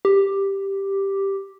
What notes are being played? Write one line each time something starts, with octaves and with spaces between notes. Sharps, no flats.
G4